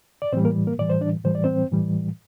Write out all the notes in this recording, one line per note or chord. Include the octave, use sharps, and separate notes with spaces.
D5
A2 E3 G3 C4 C5
A#3 A#4
A#3 A#4
A2 E3 G3 D5
C5
D4 D5
A2 E3 G3 C5
D5
C4 C5
A2 E3 G3